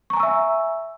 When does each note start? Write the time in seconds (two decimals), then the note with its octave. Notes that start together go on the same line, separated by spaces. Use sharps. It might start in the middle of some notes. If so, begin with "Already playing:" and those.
0.10 C#6
0.13 A#5
0.17 G#5
0.20 E6
0.23 E5